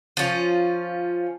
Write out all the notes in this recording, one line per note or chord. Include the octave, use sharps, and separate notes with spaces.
F3 C#4